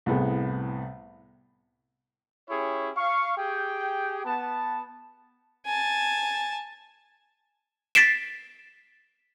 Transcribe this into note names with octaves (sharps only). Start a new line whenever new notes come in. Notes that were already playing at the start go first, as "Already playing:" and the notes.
C2 A2 B3 G#4
C#4 E4 G4 G#4 C#5
F5 C#6
G4 G#4 G5
B3 A5
G#5 A5
A6 B6 C7 D7 E7